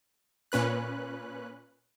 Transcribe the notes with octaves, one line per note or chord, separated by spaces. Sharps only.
A#2 C#4 B4 F#6